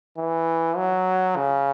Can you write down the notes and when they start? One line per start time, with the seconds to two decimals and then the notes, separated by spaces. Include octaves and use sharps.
0.18 E3
0.77 F#3
1.36 C#3